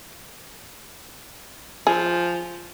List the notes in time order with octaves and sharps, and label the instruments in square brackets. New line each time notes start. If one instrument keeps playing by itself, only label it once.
[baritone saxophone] F3 [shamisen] G#4